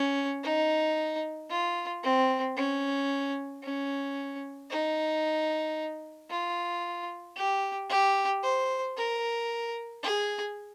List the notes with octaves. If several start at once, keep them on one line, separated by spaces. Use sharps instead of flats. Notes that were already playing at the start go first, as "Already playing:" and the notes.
Already playing: C#4
D#4
F4
C4
C#4
C#4
D#4
F4
G4
G4
C5
A#4
G#4